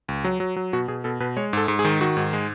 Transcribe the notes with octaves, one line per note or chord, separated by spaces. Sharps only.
C#2
F#3
F#3
F#3
B2 F#4
B2 G#4
B2 A4
B2 B4
G#3 C#5
G#2 A4
G#2
G#4
D#3
D#3 F#4
G#2
G#3